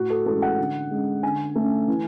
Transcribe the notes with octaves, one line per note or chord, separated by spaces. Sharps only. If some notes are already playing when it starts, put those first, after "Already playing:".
Already playing: A2 F#4
A4
E3 G#3 C#4 A4
F#5
D3
G#3 C#4
D3 G#5
A3 C#4
E3